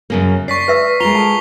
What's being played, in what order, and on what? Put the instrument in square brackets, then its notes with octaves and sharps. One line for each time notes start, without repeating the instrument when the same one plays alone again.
[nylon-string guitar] F#2 C#3 A#3
[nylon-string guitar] D5 [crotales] C#6 B6 C7
[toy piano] B4 E5 E6
[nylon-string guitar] G#3 A#3 F4 [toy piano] A#5 [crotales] C7 F7 G7
[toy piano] A4 A5